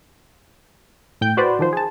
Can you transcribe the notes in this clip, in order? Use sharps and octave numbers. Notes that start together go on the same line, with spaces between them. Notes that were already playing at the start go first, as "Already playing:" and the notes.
A2 G5 G6
F#4 B4 C5 D5
D#3 F3 C5
G#4 A5